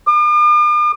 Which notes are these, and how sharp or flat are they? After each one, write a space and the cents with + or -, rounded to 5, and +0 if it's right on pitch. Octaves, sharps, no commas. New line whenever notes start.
D6 +45